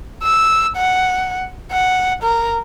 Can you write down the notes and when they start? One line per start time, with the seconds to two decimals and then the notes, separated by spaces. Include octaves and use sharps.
0.23 E6
0.77 F#5
1.72 F#5
2.23 A#4